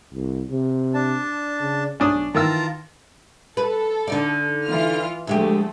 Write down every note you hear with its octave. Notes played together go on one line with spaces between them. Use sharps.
C2
C3
D4 A5
C#3
B1 C#4 D4 D#6
D#3 E3 F4 A#4 A5 A#5 E6
A4 B4
D3 D#4 D5
E3 F4 F6
D2 F3 G#3 A3 G4